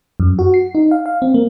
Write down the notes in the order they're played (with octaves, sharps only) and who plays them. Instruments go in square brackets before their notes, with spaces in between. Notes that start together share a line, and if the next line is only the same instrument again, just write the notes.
[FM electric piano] F#2
F#4
C7
D#4
F5
F5
C4
A#3